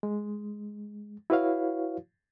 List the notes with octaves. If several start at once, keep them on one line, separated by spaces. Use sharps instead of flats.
G#3
E4 F#4 B4 C#5 F5